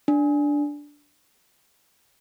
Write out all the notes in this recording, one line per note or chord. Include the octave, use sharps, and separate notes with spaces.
D4